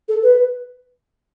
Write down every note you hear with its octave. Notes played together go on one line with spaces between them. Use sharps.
A4
B4